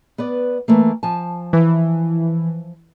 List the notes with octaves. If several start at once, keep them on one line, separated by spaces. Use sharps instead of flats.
B3 B4 D5
E3 A3 A#3
F3 G#5 A5
E3